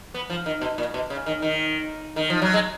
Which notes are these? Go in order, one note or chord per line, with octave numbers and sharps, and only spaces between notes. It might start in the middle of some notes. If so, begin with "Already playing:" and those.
B3
F3
D#3
B2
A#2
B2
C#3
D#3
D#3
D#3
F3
F#3
G#3